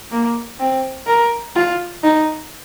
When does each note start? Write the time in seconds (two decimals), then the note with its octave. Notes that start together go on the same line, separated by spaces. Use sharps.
0.12 A#3
0.60 C4
1.07 A#4
1.56 F4
2.03 D#4